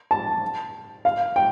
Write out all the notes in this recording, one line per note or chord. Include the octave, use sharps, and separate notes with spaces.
A5
F5
G5